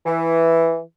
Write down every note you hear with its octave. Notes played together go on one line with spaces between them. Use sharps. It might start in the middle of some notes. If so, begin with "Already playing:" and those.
E3